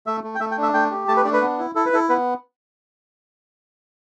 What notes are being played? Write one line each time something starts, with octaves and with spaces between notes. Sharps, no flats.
A3 E5
A3
G5
A3 E5
G5
D4
E5
A3 G5
G4
A3 A5
B4
D4 D5
B4
B3
E4
E4 A4
B4
E4 A4
B3 B4